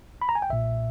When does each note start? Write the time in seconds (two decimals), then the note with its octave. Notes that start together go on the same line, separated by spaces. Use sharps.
0.22 B5
0.29 A#5
0.35 G#5
0.42 G5
0.50 B1 A#2 E5